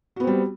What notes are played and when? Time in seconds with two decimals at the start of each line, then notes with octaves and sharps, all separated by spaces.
0.16 F#4
0.20 B3
0.24 C4
0.27 G3